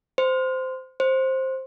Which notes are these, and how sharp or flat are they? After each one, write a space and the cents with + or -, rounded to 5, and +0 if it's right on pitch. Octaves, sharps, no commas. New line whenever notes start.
C5 -15
C5 +10